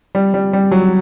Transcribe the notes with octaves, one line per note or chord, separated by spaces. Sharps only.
G3
G3
G3
F#3